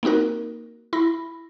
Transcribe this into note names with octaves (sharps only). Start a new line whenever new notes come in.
A#3 C4 D#4 F#4 A#4
E4 B5 A#6